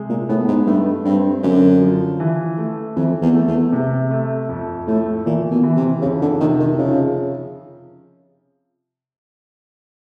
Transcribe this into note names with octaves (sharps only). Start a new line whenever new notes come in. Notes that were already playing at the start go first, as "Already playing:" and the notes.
Already playing: C3 G#3
A#2
A2 B3
G#2
G2 A3
G2 C4
F#2 D3
F3
E3
A3
F2 E3
E2
A3
E2
C3
A3
F2
A2 A3
A#2 E3
B2
E3
C3
F2 C#3
D3
C3 D#3
D#3
C#3 F3